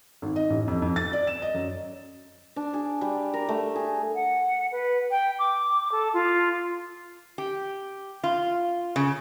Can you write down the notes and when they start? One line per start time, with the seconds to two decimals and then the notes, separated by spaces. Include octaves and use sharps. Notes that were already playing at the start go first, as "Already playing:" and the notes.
0.22 G#1
0.36 D#5
0.50 A1
0.68 F2
0.82 F2
0.96 A6
1.13 D5
1.27 E7
1.42 D#5
1.54 F#2
2.56 D4
2.74 G#4
3.01 G3
3.34 A#4
3.49 A3
3.76 G#4
4.15 F#5
4.72 B4
5.11 G5
5.39 D6
5.91 A4
6.13 F4
7.38 G4
8.24 F4
8.96 C#3